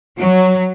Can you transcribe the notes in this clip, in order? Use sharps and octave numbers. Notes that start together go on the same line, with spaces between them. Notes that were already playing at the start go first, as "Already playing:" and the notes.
F#3